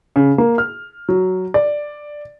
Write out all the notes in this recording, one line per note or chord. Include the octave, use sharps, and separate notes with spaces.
C#3
A#3
F6
F#3
D5